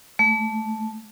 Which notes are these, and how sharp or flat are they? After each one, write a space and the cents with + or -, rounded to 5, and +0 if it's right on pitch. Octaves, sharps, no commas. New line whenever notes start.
A3 -10